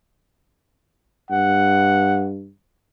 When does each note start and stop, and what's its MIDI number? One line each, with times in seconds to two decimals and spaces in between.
1.31 2.49 43
1.31 2.28 78